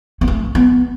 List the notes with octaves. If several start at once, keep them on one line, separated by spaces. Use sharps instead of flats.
B3
A3
B3